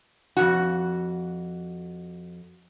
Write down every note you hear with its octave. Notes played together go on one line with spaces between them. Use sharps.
F2 A#2 F#4